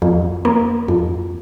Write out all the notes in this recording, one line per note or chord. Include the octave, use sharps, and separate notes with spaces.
F2
A#3
F2